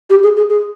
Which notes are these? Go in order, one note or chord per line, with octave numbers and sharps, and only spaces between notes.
G4
G#4
G#4
G#4